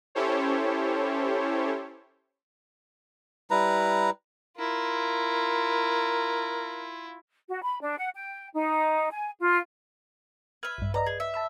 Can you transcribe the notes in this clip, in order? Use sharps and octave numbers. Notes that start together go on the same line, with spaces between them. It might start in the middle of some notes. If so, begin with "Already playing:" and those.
C#4 E4 G4 A4 C5 C#5
G3 E4 B4 A#5
E4 F4 A#4
F#4
B5
D4
F#5
G5
D#4
G#5
F4
B4 E5 F6 G#6
A#1 G2
B4 D5 D#5 A#5
G#4
E5
A5 B5 E6